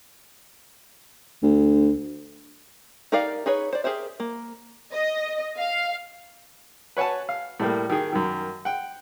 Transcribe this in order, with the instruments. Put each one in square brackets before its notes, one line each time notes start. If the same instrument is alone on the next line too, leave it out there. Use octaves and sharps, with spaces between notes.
[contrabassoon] D2
[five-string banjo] D#4 G4 A#4 D5 F5
D#4 G#4 B4 C#5
C5 D5
G4 G#4 A#4 C5 E5
A#3
[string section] D#5
F5
[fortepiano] B4 C#5 F#5 G#5 A5
F5
A2 G3 A#3
D#3 G4 G#4
F#2 D#3
F#5 G5